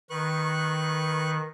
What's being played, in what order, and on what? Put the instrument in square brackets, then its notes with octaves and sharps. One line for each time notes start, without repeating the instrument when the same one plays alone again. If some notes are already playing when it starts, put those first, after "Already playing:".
[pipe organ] D#3 [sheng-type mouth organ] B4 C#6 F#6